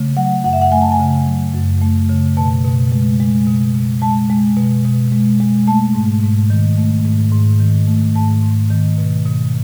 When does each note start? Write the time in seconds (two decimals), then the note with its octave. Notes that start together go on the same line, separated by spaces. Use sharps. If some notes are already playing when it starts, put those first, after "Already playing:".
Already playing: C#3 A3
0.17 F#3 F#5
0.44 F#2 F#5
0.53 E5
0.61 F#5
0.72 A3 G#5
0.82 A5
0.92 G#5
0.99 C#3
1.26 F#3
1.54 F#2
1.82 A3
2.10 C#3
2.37 B2 A5
2.65 B2
2.92 G#3
3.20 G#3
3.47 B2
3.75 B2
4.02 G#3 A5
4.30 G#3
4.57 B2
4.85 B2
5.12 G#3
5.40 G#3
5.67 A3 A5
5.94 G#2
6.23 G#2
6.50 D#3
6.77 A3
7.05 G#2
7.32 G#2
7.60 D#3
7.88 A3
8.15 G#2 A5
8.43 G#2
8.70 D#3
8.98 B2
9.25 B2